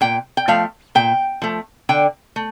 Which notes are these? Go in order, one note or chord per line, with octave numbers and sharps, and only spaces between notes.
A#2 G5
G5
F3 A3 F5
A#2 G5
F3 A3
D3 G5
A3